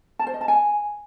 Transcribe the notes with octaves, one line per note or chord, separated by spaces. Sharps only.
A5
C5
D#5
A5
G#5